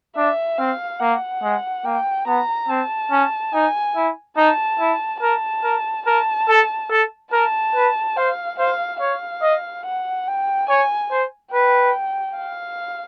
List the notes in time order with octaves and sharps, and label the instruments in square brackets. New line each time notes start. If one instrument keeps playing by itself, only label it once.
[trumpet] D4 [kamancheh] E5
[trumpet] C4 [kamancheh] F5
[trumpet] A#3 [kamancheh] F#5
[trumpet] G#3
[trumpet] A#3 [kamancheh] G5
[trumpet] B3 [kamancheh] A#5
[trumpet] C4 [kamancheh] A5
[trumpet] C#4
[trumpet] D#4 [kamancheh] G#5
[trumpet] E4
[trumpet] D#4 [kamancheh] A5
[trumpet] E4
[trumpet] A#4 [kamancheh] A5
[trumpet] A#4
[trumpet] A#4 [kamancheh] A5
[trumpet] A4
A4
[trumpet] A#4 [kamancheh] A5
[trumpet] B4
[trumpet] C5 [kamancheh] F5
[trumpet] C5 [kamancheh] F5
[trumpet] C#5 [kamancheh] F5
[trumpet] D#5
[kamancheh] F#5
G5
[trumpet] C#5 [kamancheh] G#5
[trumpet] C5
[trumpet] B4 [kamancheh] G5
[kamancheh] F5